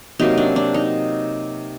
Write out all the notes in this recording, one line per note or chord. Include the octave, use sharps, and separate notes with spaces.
C3 F#3 A#3 D#4
D4
D4
D#4